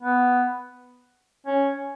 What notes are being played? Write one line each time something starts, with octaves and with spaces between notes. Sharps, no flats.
B3
C#4